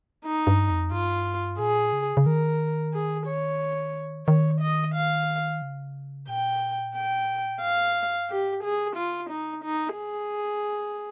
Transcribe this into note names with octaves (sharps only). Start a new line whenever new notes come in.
D#4
G2
F2
G2 F4
A#2 G#4
C#3
C#3
D#3 A#4
G#4
C#5
D#3 C#5
D#5
F5
C#3
A#2 G5
G5
G#2 F5
G2
G#2 G4
C3 G#4
D#3
C#3 F4
D#4
D#4
G#4